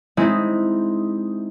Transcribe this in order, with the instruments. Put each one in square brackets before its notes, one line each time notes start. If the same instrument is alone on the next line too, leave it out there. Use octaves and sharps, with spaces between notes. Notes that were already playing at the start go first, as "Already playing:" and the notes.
[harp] G#3 C4 D#4 E4